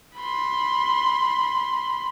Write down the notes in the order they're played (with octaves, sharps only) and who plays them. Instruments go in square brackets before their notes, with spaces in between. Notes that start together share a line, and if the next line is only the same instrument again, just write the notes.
[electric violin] B5 C6